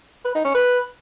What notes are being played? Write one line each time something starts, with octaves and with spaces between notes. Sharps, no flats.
B4
D#4
C#4
B4